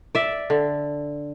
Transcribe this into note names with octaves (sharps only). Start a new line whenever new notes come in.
D5 E5
D3